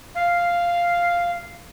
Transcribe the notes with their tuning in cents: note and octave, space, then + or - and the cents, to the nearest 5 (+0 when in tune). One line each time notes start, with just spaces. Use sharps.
F5 -5